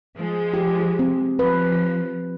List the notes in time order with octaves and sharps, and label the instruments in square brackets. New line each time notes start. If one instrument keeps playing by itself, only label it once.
[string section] F3 G#3
[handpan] G4
C4
[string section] F3 [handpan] B4